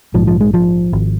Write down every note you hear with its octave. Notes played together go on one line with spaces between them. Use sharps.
A#1 G#2 F3
F3
G#3
F3
G#1